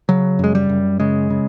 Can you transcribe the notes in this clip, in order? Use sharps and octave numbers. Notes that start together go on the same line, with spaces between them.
C#3 F#3
F#2 G#3
G3
F#2
C#3 G#3
C#3